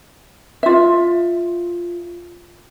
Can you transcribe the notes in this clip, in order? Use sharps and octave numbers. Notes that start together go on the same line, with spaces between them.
F4 E5